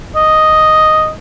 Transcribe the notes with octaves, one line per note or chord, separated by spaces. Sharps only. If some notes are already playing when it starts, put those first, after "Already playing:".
D#5